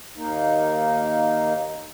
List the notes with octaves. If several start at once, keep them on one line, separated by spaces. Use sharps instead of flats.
D#2 A#3 D#4